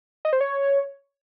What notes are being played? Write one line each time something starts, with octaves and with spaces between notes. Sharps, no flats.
D#5
C5
C#5